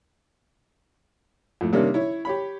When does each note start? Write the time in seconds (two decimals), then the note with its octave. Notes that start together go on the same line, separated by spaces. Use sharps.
1.61 F2 A2
1.73 C3 D#3 G3 A#3 C#4 D4
1.94 E4 C#5
2.25 G4 C#5 B5